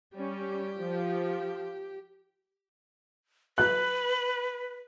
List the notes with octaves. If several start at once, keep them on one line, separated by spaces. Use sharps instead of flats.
G3 C#4 G4
F3
B4 F#6